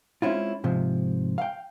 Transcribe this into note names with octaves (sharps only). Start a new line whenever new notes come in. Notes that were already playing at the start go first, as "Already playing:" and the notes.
G#3 C4 C#4 E4 F4
G#2 C3 F3
F5 G5